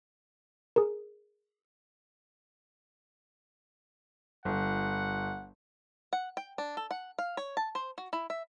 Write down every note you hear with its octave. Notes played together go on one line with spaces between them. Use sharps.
G#4 A#4
G1 F#5
F#5
G5
D4
A4
F#5
F5
C#5
A5
C5
F#4
E4
E5